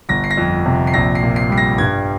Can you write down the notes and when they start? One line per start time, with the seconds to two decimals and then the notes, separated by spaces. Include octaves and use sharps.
0.09 G1 A#6
0.24 C7
0.31 A#6
0.37 F2
0.66 C3
0.87 C7
0.94 A#1 A#6
1.15 C7
1.22 A#2
1.36 C7
1.50 G3 C7
1.57 A#6
1.78 G2 G#6